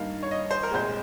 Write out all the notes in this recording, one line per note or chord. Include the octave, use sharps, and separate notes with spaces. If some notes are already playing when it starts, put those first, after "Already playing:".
Already playing: G2 D#3 A#3 F5
C#5
D#5
C5
A#4
C2 A#2 G#3 C5